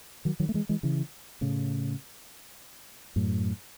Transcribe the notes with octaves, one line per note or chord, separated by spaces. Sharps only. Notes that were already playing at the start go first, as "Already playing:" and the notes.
D#3 F#3
D#3 F#3
A3
E3 G#3
E3 G#3
C#3 E3
A2 C#3
F#2 A2